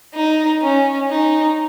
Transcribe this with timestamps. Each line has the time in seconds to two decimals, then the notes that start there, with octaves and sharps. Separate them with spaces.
0.15 D#4
0.62 C#4
1.10 D#4